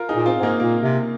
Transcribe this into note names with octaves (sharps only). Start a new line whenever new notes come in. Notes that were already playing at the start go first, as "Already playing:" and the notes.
Already playing: F4 A#4
D#4 G#4
A#2
C4 F4
G#2
A#3 D#4
A#2 A#3
C3